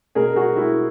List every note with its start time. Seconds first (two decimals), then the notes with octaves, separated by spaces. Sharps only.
0.15 B2 G#4 A#4
0.36 F#4 G#4
0.56 E4 F#4